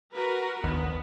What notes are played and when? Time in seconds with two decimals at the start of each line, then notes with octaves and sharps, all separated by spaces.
0.13 F#4 A#4 B4
0.64 A#1 D#2 B3